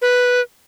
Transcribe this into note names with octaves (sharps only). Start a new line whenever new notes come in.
B4